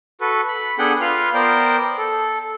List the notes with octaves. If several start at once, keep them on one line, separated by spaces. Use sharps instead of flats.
F#4 A4 B4
B5
B3 D4 G#4 A4 F#5 G5
F4 B4 C6 F6
B3 A#4 C5 D5 G5
A4